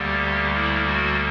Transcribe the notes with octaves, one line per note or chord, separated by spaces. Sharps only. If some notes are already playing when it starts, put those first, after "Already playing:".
Already playing: D2 D3 G3 A#3 G4
E4
F#4